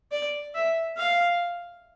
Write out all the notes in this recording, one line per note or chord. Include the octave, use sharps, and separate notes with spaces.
D5
E5
F5